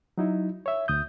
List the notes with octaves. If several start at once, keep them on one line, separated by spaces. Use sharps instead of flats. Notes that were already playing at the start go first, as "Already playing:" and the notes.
F#3 D#4 E4
C#5 E5
D2 D#6 G6